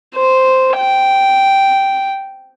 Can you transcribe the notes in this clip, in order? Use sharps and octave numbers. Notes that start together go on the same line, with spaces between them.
C5
G5